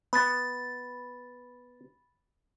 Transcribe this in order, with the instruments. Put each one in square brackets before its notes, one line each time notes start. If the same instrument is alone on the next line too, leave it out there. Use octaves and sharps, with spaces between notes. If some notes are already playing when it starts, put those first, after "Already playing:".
[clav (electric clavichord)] B3 [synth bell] B5 A6